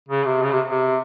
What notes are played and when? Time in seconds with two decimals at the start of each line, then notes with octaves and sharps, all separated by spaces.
0.09 C#3
0.26 C3
0.43 C#3
0.52 C3
0.69 C3